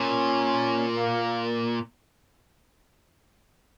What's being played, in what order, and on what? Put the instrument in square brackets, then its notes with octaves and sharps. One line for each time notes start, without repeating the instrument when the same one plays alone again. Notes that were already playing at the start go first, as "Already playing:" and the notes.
Already playing: [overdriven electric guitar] A#2 [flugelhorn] C#4
[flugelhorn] A#3